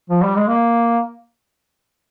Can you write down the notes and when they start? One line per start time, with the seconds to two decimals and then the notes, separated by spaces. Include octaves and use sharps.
0.10 F3
0.23 G3
0.36 G#3
0.48 A#3